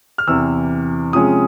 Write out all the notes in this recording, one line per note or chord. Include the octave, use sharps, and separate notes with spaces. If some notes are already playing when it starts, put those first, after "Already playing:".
F6
E2 C3 E3 E6
C3 F3 G#3 C#4 D#6